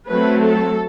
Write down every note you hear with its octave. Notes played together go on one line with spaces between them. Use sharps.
F#3 A3 C4 B4
A4